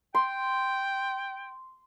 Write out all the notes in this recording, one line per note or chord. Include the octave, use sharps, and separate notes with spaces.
G5 C6